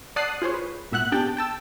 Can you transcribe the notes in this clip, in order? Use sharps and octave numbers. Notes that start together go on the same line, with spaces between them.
D5 F#5 A5 D#6 F#6 C7
F4 G#4 C5 C#5
B4
G#1 A#2 E5 F#5 F#6
B3 D4 G4 G#4 G5 A5
G5 A5 E6